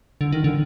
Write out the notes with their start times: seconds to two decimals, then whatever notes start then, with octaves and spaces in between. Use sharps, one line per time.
0.21 D3
0.32 D#3
0.44 D3